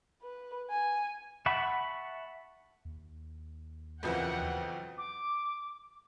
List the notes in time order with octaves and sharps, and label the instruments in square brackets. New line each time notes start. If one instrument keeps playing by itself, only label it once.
[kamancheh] B4
G#5
[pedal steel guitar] E5 F#5 A5 B5 C#6
[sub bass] D#2
[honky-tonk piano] B1 F2 F3 [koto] C#3 E3 A#3 [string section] F#5 G5
[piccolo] D6